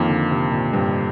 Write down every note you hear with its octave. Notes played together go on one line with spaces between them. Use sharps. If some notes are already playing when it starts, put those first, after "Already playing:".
Already playing: F2 D#3 A#3
D3
C3
A#2
G2